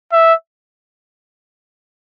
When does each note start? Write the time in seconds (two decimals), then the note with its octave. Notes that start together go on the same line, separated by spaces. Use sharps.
0.12 E5